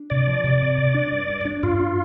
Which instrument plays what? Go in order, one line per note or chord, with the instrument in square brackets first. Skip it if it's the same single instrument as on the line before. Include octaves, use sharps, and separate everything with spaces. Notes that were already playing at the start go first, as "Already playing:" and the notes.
Already playing: [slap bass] D4
[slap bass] C3 [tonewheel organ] D5
[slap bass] F3
C3
C3
C3
D4
G2
G2
D4
[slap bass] G2 [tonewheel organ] F4
[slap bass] D4